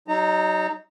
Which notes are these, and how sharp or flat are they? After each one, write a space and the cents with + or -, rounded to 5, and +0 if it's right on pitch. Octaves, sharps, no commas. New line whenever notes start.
F#3 +40 D#4 +5 A#5 -30